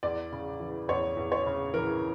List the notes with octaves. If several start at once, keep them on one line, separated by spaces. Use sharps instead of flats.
E2 D5
C#3
E3
E2 C#5
E2
C#5
C#3
E3 A#4